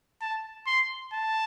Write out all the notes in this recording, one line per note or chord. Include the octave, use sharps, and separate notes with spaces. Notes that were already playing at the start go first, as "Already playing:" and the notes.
A5
C6
A5